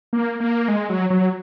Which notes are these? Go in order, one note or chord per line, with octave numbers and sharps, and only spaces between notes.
A#3
A#3
G#3
F#3
F#3